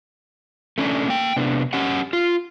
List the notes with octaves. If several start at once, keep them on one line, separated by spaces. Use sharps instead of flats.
A3 C#4 D4
A#3 G5
C3 B3 D4
C#4 G4 F#5
F4